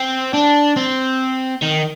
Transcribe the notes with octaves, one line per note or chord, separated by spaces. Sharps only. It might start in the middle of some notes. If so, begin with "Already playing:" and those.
Already playing: C4
D4
C4
D#3